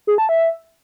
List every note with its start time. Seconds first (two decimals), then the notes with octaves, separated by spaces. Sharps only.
0.07 G#4
0.18 A5
0.29 E5